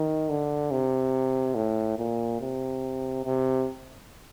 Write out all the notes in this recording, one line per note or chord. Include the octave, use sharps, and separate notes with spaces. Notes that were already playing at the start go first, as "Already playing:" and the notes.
Already playing: D#3
D3
C3
A2
A#2
C3
C3